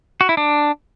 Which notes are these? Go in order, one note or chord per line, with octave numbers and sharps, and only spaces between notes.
F#4
E4
D4